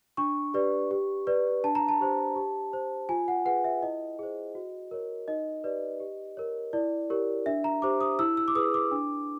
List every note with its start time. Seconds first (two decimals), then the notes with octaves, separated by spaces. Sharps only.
0.17 D4 C#6
0.54 G4 B4 D5
0.91 G4
1.27 B4 D5
1.64 D4 A5
1.75 A#5
1.89 A5
2.01 G4 C5
2.36 G4
2.73 C5
3.09 F4 G#5
3.28 F#5
3.45 G#4 B4 F#5
3.64 E5
3.82 E4 D#5
4.19 G#4 C5
4.55 F#4
4.91 A#4 C#5
5.28 D#4 D#5
5.64 G4 B4 D5
6.00 G4
6.37 A#4 C#5
6.73 E4 D5
7.10 G4 A#4 C#5
7.46 D4 E5
7.64 A#5
7.82 G4 C5 D6
8.01 D#6
8.19 E4 E6
8.37 E6
8.48 D6
8.55 G#4 B4 D#6
8.74 D6
8.92 D4